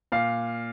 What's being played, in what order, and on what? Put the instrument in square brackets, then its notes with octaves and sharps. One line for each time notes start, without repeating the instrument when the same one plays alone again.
[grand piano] A#2 F5